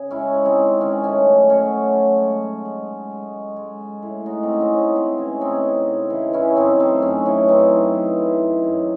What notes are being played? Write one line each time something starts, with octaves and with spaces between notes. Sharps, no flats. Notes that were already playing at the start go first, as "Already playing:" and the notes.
Already playing: C#3 G#4
G#3 C#4 E4
G#3
C4 D#4
G#3
D#3 C#4
A3 C#4
F#3
F#3 C#4
A3
F#3
G#3
G#3
G#3
G#3
G#3
G#3
G#3
G#3
A2
G#3 D#4 F#4
C4 D#4
A2 C#4
C4 D#4
G#3
C4 D#4
E3 C4
E3 C#4
C#3 C4 D#4
C#3
C#3
E3
E3 C#4 E4
F#2 C4 D#4
A3 C4 D#4
F#2 C#4
E3 C#4
F#2 C4 D#4
E3
E3
E3
F#2
F#2